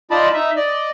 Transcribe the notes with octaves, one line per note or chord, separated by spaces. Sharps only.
D#4 F4 D5 D#5 A5 B5
D#4 E5
D5 D#5